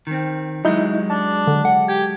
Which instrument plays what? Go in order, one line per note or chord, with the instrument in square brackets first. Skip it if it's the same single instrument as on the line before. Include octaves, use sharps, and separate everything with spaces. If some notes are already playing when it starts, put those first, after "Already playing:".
[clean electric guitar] D#3 C4
[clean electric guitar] F#3 G#3 [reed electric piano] D#4 E4 G6
[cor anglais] D4 [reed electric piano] A5
[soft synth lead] D3
F#5
[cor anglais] G4 [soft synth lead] G#6